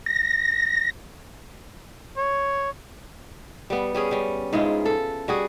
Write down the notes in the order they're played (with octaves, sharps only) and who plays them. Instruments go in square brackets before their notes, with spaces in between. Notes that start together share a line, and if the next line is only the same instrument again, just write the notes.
[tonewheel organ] A#6
[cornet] C#5
[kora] G3 B3
G3 C#4 G#4
G3 C#4
G#2 G#3 E4 F4
A4
G3 F#4 G#4